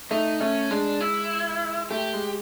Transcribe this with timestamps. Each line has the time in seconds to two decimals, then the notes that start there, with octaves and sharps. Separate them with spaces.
0.11 A3 D#4
0.40 A3 C#4
0.70 G#3 D4
1.01 E4
1.90 A3 G4
2.13 G#3